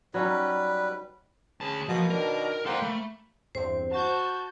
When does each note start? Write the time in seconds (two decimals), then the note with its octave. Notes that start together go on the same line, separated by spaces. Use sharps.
0.14 F#3 G3 C#4 D#4 B4
1.61 D2 C#4 G#4 B4 A5
1.89 B2 F3 A#3
2.10 D#3 D4 A#4
2.66 A#3 A4 C5 F#5 G5 C6
2.82 A3 B5
3.55 E2 G2 C4 C5
3.91 F#4 A5 G6